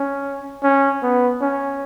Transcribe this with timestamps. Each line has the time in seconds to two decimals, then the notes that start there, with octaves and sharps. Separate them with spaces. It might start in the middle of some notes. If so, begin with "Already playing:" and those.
Already playing: C#4
0.63 C#4
1.03 B3
1.42 C#4